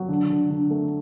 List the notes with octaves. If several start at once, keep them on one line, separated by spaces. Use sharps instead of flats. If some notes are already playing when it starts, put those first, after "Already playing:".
Already playing: F#3
D3
D3
D3
A3